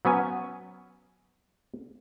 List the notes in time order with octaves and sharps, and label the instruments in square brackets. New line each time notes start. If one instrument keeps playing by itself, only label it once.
[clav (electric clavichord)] F#3 B3 C#4 G#5